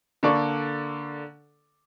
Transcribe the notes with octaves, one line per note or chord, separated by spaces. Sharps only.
D3 A#3 A4 D5 C#6